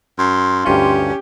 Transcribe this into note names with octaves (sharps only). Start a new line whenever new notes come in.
F#2 C6
D2 G2 C#4 F4 G4